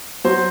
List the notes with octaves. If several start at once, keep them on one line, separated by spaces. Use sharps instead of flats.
F#3 C5